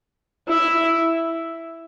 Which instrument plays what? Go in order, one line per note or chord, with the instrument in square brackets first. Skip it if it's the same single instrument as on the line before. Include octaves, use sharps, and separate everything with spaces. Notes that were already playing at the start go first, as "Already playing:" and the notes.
[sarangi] E4